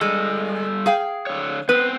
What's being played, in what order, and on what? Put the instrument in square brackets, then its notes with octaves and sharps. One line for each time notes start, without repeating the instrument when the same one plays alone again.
[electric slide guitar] G3 A4 [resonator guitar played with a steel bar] G#3
[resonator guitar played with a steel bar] G#4 F5 G5
[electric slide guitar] D3 C#5
[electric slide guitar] B3 C4 [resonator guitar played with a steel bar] B4